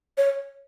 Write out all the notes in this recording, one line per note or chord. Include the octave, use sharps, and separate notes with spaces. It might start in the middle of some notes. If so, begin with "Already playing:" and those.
C#5